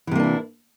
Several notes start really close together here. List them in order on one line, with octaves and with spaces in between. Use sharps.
E3 C3 A#3 D4 E4